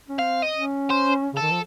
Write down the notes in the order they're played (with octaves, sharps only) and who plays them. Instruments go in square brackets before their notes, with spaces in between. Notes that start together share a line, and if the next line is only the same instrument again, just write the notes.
[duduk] C#4
[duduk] C4 [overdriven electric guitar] F5
[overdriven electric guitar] D#5
[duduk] C#4
[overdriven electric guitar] C5
[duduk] C#3 [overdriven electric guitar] A4
[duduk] D#3
F3